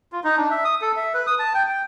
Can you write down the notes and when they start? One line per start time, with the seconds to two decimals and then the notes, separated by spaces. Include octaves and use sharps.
0.12 F4
0.24 D#4
0.37 D4
0.51 E5
0.65 D#6
0.81 A4
0.96 E5
1.14 B4
1.27 D#6
1.39 A5
1.54 G5
1.68 G5